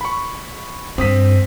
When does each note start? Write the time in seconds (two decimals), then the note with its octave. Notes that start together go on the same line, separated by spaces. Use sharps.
0.01 B5 C#6
0.98 G2 C4 D#6 B6